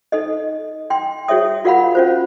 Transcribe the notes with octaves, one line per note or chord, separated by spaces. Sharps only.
D#4 A4 D#5
G5 C6
F#4 G#4 C#5 E5 D#6
F4 F#4 A#4 F5 F#5 B5
C#4 F4 C5